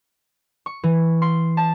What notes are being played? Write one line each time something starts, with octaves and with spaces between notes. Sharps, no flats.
C#6
E3
C6
A5